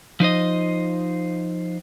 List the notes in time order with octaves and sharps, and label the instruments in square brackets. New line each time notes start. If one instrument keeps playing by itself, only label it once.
[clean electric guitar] F3 D#4 C5 D#5